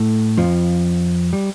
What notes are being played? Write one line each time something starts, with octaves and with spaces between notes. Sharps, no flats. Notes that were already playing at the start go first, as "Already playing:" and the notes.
Already playing: A2 A3
F2 F3
G3